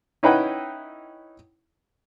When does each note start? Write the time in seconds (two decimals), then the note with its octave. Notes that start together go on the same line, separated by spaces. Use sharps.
0.23 C#4 D#4 E4 B4 F#5 G5